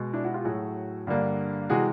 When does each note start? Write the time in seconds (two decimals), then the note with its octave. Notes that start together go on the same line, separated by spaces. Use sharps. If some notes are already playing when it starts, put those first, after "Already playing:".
Already playing: B2 G#3
0.13 D4 E4
0.24 E4 F#4
0.34 F4 G4
0.45 A2 F#3 A3 F#4 G#4
1.07 G2 D3 G3 A#3
1.70 C3 E3 G#3 F#4 G#4